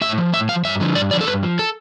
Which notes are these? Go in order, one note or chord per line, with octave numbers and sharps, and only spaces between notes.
A2 E5
F3
A2 E5
F3 F5
G2 E5
D3 F3
G2 D5
D3 F3 D5
A4
G2 B4
F3
A4